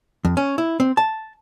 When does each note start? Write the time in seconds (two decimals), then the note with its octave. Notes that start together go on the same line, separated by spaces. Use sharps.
0.25 F2
0.37 C#4
0.58 E4
0.80 C4
0.97 A5